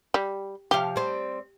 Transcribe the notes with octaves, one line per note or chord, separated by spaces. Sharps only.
G3
C3 F3 G4 F5
G3 C4